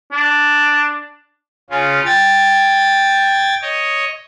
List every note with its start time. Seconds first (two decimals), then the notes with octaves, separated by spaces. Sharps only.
0.12 D4
1.70 C#3 C#4 F4
2.06 G5 G#6 A6
3.62 C#5 D#5